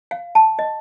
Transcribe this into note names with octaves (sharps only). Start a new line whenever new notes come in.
F5
A5
D#5